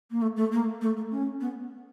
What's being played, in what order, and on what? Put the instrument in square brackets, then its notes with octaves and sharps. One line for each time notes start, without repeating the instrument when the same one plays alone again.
[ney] A#3
A3
A3
A#3
A3
A3
C#4
B3